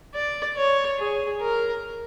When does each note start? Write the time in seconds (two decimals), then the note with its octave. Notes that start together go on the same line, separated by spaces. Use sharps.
0.15 D5
0.57 C#5
0.99 G#4
1.41 A#4